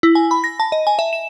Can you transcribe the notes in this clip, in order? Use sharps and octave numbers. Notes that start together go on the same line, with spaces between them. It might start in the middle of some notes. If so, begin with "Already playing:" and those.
E4
G#5
B5
A#6
A5
D#5
G#5
E5
E7